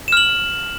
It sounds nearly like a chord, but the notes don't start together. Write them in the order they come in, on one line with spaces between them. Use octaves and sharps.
E7 F6 F#7